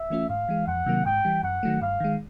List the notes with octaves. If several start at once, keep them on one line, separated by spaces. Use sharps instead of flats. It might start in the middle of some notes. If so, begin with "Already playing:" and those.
Already playing: E5
E3 A3 C#4 F4
G#2 F5
E3 G#3
F2 F#5
C3 D#3 F#3 A#3
G#2 G5
E3 G3
F#2 F#5
D#3 F#3 A3
G2 F5
D#3 G#3